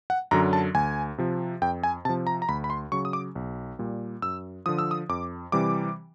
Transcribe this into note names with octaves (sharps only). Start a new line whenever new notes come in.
F#5
F#2 D3 F#3 A#5
A5
D2 G#5
C3 F3
F2 G5
G#5
C3 F3 A5
A#5
A#5
D2 B5
B5
C6
C#3 F#3 C#6
D#6
D6
B1
A#2 G3
F#2 E6
D3 F3 D#6
E6
D#6
F2 D6
C3 E3 G3 D6